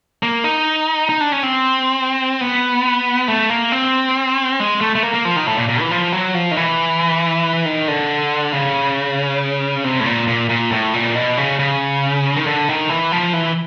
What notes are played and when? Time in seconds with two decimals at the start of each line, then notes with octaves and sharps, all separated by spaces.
0.23 A#3
0.44 D#4
1.09 D#4
1.21 D4
1.32 C#4
1.43 C4
2.41 B3
3.28 A3
3.50 A#3
3.72 C4
4.60 G#3
4.81 A3
4.95 A3
5.03 A#3
5.14 A#3
5.25 F3
5.36 D#3
5.47 A2
5.57 A#2
5.69 A#2
5.80 E3
5.91 F3
6.12 F#3
6.34 F3
6.51 D#3
6.56 E3
7.66 D#3
7.88 D3
8.52 C#3
9.84 C3
10.00 A2
10.06 A#2
10.28 A#2
10.49 A#2
10.72 A2
10.94 A#2
11.15 B2
11.37 C#3
11.59 C#3
12.36 D#3
12.47 D3
12.69 D#3
12.89 E3
13.12 F3
13.33 E3